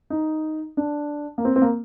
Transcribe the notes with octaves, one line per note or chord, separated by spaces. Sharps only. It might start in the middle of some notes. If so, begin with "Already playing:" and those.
D#4
D4
A#3
C4
C4
A#3